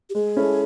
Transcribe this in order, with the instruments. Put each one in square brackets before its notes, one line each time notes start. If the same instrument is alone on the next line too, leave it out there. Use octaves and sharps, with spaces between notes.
[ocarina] G4
[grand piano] G#3 [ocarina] G#4
[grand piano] C#4 E4 A4